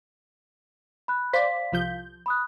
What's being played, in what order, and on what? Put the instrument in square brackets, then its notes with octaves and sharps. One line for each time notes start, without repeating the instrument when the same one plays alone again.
[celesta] B5 F#6
[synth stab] C5 D5 [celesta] F5 B6
[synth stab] C2 F3 G6
[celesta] B5 D#6 F#6